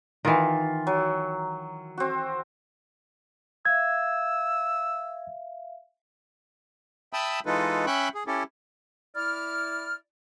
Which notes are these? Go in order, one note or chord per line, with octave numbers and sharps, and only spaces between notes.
D#3 E3 F4
F#3
C4 F#4
E5 F5 E6 G#6
E5 G5 A5 B5 D#6 E6
E3 G#3 D#4 F4 A4 B4
C#4 E5 G5 B5 C#6 F#6
G#4
C#4 E4 G4 A4
E4 D5 F6